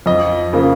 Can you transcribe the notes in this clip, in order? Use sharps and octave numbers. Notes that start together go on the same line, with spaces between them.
F2 D#5
C#3 F3 A#3